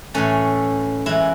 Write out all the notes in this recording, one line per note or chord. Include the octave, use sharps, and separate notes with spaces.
A2 E3 A3 C#4
F#2 E3 G#3 E4